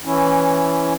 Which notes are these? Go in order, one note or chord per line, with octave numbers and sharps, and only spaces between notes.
E3 C#4 E4